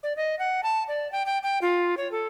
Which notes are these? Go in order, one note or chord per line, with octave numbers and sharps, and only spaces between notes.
D5
D#5
F#5
A5
D5
G5
G5
G5
F4
C#5
A4